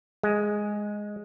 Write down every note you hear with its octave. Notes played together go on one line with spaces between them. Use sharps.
G#3